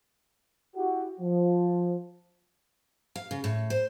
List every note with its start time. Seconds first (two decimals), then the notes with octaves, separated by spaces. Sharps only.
0.76 E4 F#4 G4
1.20 F3
3.16 F5
3.31 C#3
3.44 A2
3.70 C5